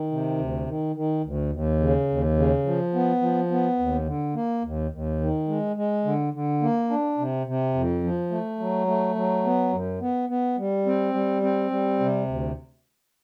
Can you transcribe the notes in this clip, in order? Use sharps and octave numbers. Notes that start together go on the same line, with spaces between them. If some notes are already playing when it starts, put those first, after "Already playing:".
Already playing: D#3
C3
D2
D#3
D#3
D2
D#2
C#3
D#2
C#3
F3
B3
F3
B3
D#2
D3
A#3
D#2
D#2
D#3
G#3
G#3
D3
D3
A#3
D4
C3
C3
F2
F3
A3
F#3
A3
F#3
B3
F#2
B3
B3
G3
C4
G3
C4
G3
C3
D2